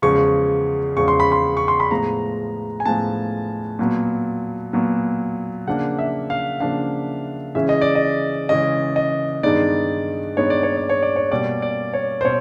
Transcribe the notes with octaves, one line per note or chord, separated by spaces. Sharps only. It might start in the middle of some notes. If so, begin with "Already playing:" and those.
E2 C#3 F3 G#3 C#6
E2 C#3 F3 G#3 C#6
C6
B5
C6
C#6
C6
B5
A2 F3 G#3 B3 A#5
G#5
A2 F3 G#3 B3 A5
A#2 F#3 B3
A#2 F#3 B3
C#3 F3 A#3 D4 F#5
E5
F5
C#3 F3 A#3 D4 F5
C#3 E3 G#3 C#4 E5
D#5
D5
D#5
C#3 E3 G#3 C#4 D#5
D#5
G2 D#3 G#3 B3 D#4 D5
G2 D#3 G#3 B3 D#4 C#5
D5
C#5
D5
C#5
D5
C#5
B2 G3 A#3 D5
D5
C#5
C5
B2 C#5